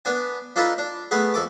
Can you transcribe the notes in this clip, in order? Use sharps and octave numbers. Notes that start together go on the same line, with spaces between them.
B3 D4 G#5
D4 D#4 F4 A4 B4
D4
A3 B3 G#4 B4
F2 A4 D6